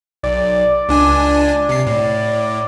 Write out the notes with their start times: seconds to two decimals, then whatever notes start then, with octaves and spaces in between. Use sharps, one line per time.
0.23 B1 D5
0.89 C#2 D4 G#5
1.69 C3 C7
1.87 A2